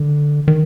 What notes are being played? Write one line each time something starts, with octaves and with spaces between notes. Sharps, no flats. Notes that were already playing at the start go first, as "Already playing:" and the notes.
Already playing: D3
D#3